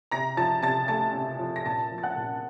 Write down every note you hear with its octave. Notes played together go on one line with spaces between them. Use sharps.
C3 A#5 A#6
F3 A5 A6
C3 A5 A6
A3 A5 A6
C3
F3
A#6
A#2 A5 A6
F3
A6
F#5 F#6
A#2